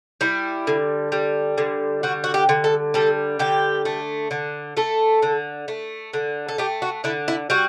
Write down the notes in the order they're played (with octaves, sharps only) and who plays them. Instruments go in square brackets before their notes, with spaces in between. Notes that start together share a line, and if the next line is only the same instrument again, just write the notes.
[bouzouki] G3 E4
D3
G3
D3
G3 F#4
F#4
G4
D3
A4
G3 A4
D3 G4
A3
D3
A3 A4
D3
A3
D3
A4
A3 G4
F#4
D3 E4
E4
G3 F#4